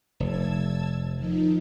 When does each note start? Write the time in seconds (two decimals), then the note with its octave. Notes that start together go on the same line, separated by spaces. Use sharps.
0.20 F1 A5 E6 G#6
1.14 D#3 F3 D#4